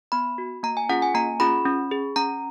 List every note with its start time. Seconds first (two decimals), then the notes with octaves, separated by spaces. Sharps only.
0.12 B3 B5
0.38 F#4
0.63 A#3 A#5
0.77 G#5
0.89 C#4 F4 G#4 F#5
1.02 G#5
1.15 A#3 A#5
1.40 C#4 F4 G#4 B5
1.65 C#4
1.91 G#4
2.16 C#4 A#5